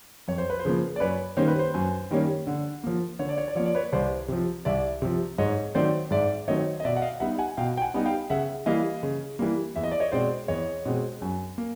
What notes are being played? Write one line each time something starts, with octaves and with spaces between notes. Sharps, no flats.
F2 C#5
C5
B4
C5
C#3 F3 A#3
D5
F#2 B4 C#5
D#3 G3 A#3 C#4 C5
B4
C5
F#2
D#3 G3 A#3 C#4
D3
F3 A#3
D3 C#5
D5
C#5
D5
F3 A#3 C#5
D5
B4 C#5
C2 C5 D5
C3 F3
C2 D5 E5
C3 F3
G#2 C#5 D#5
D#3 F#3 A3 C4 C5 D5
G#2 D5 E5
D#3 F#3 A3 C4 C#5 D#5
D#5
B2 D5 E5
F#5
D#5 F5
G3 B3 D#4 E5 F#5
F#5 G#5
B2 F5 G5
G5
F#5 G#5
G3 B3 D#4
F5 G5
C#3 E5 F#5
E3 G3 A#3 D#5 F5
C#3
E3 G3 A#3
E2 E5
D#5
D5
C#5 D#5
B2 G#3 C4 C5 D5
E2 C#5 D#5
B2 G#3 C4
F#2
A#3